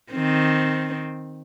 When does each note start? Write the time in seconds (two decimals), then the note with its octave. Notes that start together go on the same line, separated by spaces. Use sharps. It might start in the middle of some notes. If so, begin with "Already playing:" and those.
0.12 D#3 C4